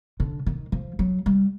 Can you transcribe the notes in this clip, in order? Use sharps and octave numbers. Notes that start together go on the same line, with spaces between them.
D3
D#3
F3
F#3
G3